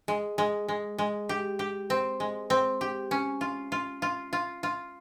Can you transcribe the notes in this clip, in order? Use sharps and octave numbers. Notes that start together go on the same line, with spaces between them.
G#3
G#3
G#3
G#3
G4
G4
C4
G#3
C4
G4
C#4
F4
F4
F4
F4
F4